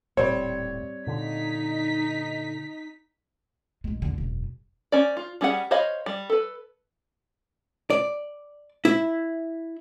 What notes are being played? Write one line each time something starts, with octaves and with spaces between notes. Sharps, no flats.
D#1 A2 G3 C4 C#5
A#2 D3 D#4 B6
A#1 G#3
E2 D3
E1 F#2
C#4 C5 D5
F4
G3 C#4 G#4 C5 F#5
C5 C#5 D#5 F5 B5
G3
A4 B4
D5
E4